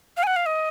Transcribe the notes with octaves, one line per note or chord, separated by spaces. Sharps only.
F5
G#5
F#5
F5
D#5